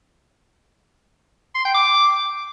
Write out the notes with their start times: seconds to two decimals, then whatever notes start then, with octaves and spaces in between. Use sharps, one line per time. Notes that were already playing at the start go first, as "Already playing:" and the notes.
1.55 C6
1.65 G5
1.75 D6